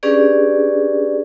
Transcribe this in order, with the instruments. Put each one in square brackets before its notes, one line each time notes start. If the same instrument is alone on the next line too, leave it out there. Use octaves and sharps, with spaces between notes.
[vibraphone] C#4 D4 G4 G#4 B4 D5